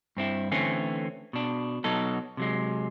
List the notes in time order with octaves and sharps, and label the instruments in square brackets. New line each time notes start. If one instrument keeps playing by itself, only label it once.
[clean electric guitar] G2 C4 E4
D3 E3 A3 C4 C#4
B2 D4
B2 F#3 D#4 A4
C3 F#3 G#3